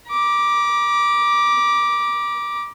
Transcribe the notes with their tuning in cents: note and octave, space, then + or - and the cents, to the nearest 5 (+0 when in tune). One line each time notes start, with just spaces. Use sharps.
A#5 +45 D6 +0